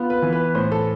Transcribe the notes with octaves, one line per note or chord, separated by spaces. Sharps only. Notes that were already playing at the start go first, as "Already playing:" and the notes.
Already playing: B3 F4
B4
E3
B4
A2 C5
A4